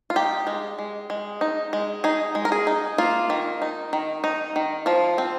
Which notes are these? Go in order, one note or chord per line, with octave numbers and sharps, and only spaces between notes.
F4
D#4 G4
G#3
G#3
G#3
D#4
G#3
D#4 G#4
G#3
A#4
G#4
D#4
A#3 F4
D#3
D#4
D#3
D#4
D#3
F3 F4
C4